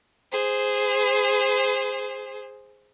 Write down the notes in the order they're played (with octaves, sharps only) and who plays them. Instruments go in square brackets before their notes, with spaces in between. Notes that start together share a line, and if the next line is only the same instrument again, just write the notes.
[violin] G#4 C5